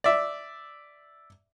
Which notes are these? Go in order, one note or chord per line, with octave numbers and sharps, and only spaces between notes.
D5 E5